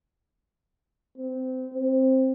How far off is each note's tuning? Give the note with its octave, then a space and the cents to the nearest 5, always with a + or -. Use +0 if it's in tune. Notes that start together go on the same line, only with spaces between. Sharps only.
C4 -20
C4 +5